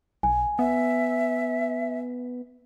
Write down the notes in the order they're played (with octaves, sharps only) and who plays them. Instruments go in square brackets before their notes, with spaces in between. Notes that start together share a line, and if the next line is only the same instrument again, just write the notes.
[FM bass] B1 [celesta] G#5
[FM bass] B3 [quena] E5